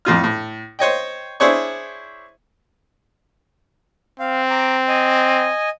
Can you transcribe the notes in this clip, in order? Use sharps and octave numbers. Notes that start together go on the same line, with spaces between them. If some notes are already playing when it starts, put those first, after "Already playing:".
F2 A2 F4 F6
A2
C5 C#5 D#5 G5
D4 E4 G#4 C5 C#5 C#6
C4 F5
A#5 D6
D#5 G#5